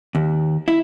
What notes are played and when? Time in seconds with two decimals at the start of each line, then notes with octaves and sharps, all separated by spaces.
0.15 D#2
0.68 E4